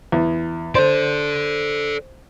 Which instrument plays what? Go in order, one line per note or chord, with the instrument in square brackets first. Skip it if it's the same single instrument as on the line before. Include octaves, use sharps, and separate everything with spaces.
[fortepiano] E2
[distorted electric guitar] A4 D5 [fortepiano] C5